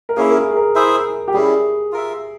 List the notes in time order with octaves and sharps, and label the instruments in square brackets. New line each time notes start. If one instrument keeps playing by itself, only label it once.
[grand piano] A#4
[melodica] A#3 C#4 E4 [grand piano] G#4
[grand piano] A#4
G#4
G#4
A#4
[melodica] E4 G#4 C5 E5
[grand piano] G4
[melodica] G3 C#4 E4 [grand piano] G#4
[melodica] F4 A#4 E5